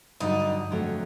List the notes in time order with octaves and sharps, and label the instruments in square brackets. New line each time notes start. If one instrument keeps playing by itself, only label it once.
[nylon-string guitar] G2 D3 F#3 [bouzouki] D#4
[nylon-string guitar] F2 D3 F#3 A3